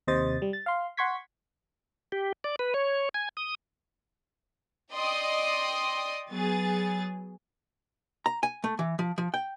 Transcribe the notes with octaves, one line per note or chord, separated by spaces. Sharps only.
D#2 C3 C5 D#5 A6
G3
A6
F5 C6
F#5 C6 C#6 G#6 B6
G4
D5
B4
C#5
G#5
D#6
D5 D#5 G5 C6 D#6
F#3 B3 G#4 A6
A#5
G#5
A3
E3
F3
F3
G5